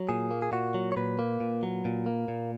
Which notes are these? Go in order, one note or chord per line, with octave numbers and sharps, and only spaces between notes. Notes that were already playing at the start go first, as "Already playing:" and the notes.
Already playing: F#3
A#2 G#4
A#3
G#4
A#2 F#4
F#3
C#5
A#2 B4
A#3
A#2
F#3
A#2
A#3
A#2